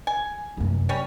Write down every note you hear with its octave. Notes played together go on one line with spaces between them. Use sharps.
G#5
F1 F#2
G3 C#4 C#5